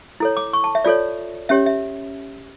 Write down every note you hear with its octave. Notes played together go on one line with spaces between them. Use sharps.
E4 A4 C#5
D6
C#6
A5
E5
F4 A4 C#5 D5
C#4 G4 C#5 E5
E5